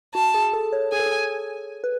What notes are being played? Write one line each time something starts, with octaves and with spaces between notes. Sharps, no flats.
F#4 A5
G#4
A4
C#5
G#4 G#5
A4
G#4
B4